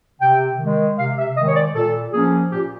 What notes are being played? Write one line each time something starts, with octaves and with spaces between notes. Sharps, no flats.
C3 G5
D#3 G#3
C3 F5
E5
D#3 G#3 D#5
C#5
D5
A#2 A4
F3 A#3 C#4 G#4
A#2 G4